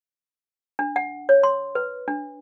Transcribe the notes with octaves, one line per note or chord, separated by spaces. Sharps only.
D4
F#5
C#5
C6
B4
D4